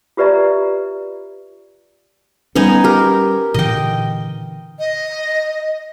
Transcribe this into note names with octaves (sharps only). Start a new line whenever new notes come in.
F4 G4 B4 D5 E5 A#5
G3 B3 C#4 D#4 G#5
G4 A#4
A#2 D3 E3 D#5 G5
D#5